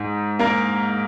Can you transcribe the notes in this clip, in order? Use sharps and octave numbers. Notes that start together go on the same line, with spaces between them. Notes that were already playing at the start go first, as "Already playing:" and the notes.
Already playing: G#2
A#3 A#4